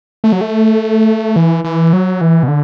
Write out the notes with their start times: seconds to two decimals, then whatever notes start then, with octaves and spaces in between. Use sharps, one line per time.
0.24 A3
0.32 F#3
0.41 A3
1.36 E3
1.64 E3
1.93 F#3
2.21 E3
2.43 B2
2.48 D3